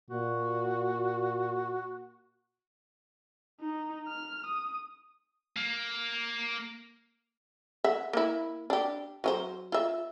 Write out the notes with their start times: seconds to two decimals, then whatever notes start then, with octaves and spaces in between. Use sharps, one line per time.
0.10 A#2 F#4
3.60 D#4
4.08 F6
4.46 D#6
5.56 A#3
7.84 E5 F#5
8.13 A#3 E4
8.70 D4 G4
9.24 F#3 F4 C5
9.72 F4 E5